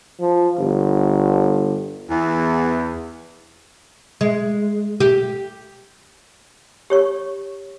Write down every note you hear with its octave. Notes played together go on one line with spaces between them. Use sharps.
F3
G1
E2
G#3
G4
G4 C#5 C#6